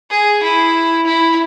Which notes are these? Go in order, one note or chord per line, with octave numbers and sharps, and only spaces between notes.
G#4
E4
E4